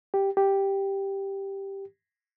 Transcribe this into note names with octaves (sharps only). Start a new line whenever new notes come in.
G4
G4